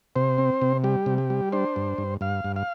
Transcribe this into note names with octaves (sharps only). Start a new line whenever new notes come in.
C3 C5
C4
C3
G3 G4
C3
G4
G3
D4 C5
G2
G2
G2 F5
G2
F5